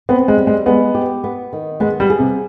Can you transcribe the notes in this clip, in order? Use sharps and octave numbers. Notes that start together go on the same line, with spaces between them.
B3 C4
G#3
G3
G#3
G#3 B3
G4
B3
D#3
G#3 B3
G3
G#4
C3